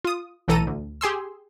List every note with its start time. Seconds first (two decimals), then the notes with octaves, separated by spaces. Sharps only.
0.05 F4 D#6
0.48 B1 A2 E3 A4 A#5 D#7
0.67 D2
1.01 G4 G#4 C6 E6